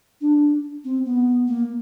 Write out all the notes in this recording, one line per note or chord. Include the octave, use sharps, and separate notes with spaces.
D4
C4
B3
A#3